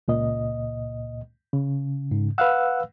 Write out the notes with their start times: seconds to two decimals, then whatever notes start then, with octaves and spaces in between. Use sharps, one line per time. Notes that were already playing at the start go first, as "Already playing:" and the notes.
0.08 C#2 A#2 D#5
1.53 C#3
2.11 G#2
2.38 B4 F5 F#5 E6 F#6